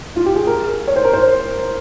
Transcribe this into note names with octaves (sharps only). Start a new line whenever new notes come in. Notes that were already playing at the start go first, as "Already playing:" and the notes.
F4
G4
G#4
A#4
C#5
C5
A#4
C5